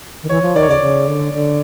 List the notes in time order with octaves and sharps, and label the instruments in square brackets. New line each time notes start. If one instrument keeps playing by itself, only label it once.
[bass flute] D#3
[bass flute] E3 [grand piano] C#5
[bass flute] F3
[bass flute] D#3 [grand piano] D5
[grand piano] C#5
[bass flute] C#3 [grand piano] D5
[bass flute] C#3
D3
D3